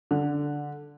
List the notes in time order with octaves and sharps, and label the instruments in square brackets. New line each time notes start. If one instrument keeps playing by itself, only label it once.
[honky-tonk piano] D3